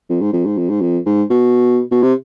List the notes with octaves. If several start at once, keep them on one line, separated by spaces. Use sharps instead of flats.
F2
G#2
F2
G#2
F2
G#2
F2
G#2
B2
B2
C3